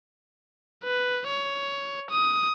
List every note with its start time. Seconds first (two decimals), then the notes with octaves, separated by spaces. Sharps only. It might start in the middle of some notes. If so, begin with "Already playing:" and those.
0.84 B4
1.27 C#5
2.10 D#6